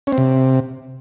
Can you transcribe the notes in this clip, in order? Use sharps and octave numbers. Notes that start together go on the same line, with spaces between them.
C#4
C4
C3